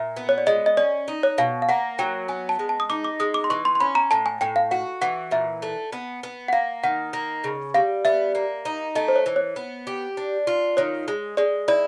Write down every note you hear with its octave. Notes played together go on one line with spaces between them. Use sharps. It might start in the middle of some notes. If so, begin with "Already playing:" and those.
Already playing: A#2 E5
B3
C#5
D5
G#3 D#5
D#5
C#4 D5
D#4
C#5
B2 F5
F5
A#3 F#5
F#3 G5
B3 G#5
A5
G#3
A5
D#6
D#4 D6
D6
G#3 D#6
D6
C6
E3 C#6
C6
C6
C#4 B5
A#5
A2 A5
G#5
A2 G5
F5
F#4 F#5
E3 F#5
A#2 E5
A3
B3
B3
F#5
A#3 F5
D#3 F#5
A#3
C#3
G3 F5
B3 E5
A#3
D#4
A3 D#5
C5
C#5
E3
C#5
B3
G4
D4
F4
D#3 C#5
G#3
G#3 D5
E4 D5